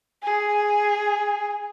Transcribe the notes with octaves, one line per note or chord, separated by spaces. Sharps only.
G#4